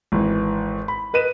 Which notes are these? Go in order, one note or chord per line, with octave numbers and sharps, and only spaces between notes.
G#1 E3
B5
A#4 B4 D#5 D#7 E7